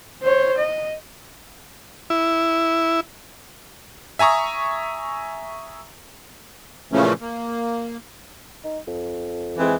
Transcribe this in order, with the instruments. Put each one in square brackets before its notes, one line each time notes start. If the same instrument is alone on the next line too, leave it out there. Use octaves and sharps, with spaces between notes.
[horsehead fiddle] C5 C#5
D#5
[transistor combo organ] E4
[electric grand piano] E5 G#5 A#5 C#6 D#6
[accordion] A#2 C#3 E3 F3 A3 C#4
A#3
[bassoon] D#4
F2
[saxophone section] E3 G#3 C4